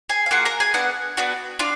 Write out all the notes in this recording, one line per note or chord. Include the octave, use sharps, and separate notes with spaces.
G#4 G#5
F5
A#3 F4 F#4 G#4 F#5
A#4 A#5
G#4 G#5
B3 D4 F#4 F#5
B3 D4 F#4
D4 F4 F5